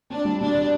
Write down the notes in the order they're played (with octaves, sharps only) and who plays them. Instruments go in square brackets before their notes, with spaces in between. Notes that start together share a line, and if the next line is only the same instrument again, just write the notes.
[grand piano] C4 [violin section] D4
[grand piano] G3
[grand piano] B2 [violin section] D4
[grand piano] B2